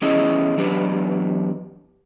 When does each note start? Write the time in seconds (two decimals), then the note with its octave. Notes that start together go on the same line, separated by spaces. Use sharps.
0.02 E2 C#4 E4 G#4 D#5
0.57 E2 F#3 D4 G4 B4